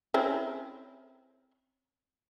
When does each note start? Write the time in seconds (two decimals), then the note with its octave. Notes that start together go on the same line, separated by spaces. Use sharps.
0.14 C4 C#4 E4